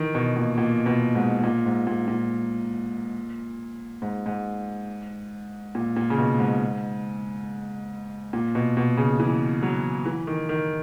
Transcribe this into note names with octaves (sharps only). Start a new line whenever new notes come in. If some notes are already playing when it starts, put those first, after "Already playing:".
Already playing: D#3 E3
B2
A#2
A#2
B2
G#2
A#2
G#2
A#2
A#2
G#2
G#2
A#2
A#2
C#3
B2
G#2
A#2
B2
B2
C#3
E3
F#3
E3
D#3
D#3